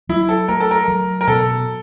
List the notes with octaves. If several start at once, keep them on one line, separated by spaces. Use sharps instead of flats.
F#3 E4
A4
A3 A#4
A4
A#4
F#3
A#4
B2 A4